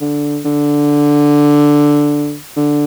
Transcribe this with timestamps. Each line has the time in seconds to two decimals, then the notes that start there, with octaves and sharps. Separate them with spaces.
0.01 D3
0.45 D3
2.57 D3